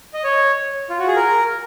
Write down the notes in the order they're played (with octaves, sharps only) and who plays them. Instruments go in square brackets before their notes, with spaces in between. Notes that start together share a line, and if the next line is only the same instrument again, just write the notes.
[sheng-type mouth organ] D#5
C#5
F4
F#4
G#4
A#4